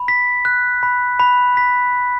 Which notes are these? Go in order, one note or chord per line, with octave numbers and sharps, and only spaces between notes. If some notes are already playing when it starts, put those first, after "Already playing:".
Already playing: B5
B6
F#6
B5
B5
B6